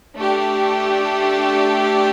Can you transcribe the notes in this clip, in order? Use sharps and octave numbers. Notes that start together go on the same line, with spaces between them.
A3 D4 G4